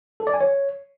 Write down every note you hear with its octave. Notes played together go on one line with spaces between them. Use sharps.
A4
D5
G#5
C#5